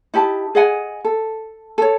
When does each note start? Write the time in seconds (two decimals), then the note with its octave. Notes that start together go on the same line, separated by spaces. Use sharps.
0.14 D#4 E4 G4 A5
0.55 G#4 D#5 F#5 G#5
1.04 A4
1.78 A4 C#5